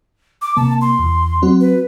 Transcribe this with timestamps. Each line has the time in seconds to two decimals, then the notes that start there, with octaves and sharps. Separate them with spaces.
0.42 D6
0.57 C3 A#3 A5
0.81 C6
0.99 E2
1.42 F#3 C4 F#4
1.61 B4